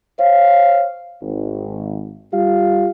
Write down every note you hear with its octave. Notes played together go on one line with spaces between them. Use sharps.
C5 C#5 F5
G#1
G3 F4 G4 F5